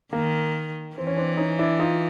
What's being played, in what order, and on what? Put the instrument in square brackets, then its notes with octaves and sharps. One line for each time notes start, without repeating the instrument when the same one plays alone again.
[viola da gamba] D#3 [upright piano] A#3
[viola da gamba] E3 [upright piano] C4
[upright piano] C#4
C4 D4
C#4 D#4
D4 E4
D#4 F4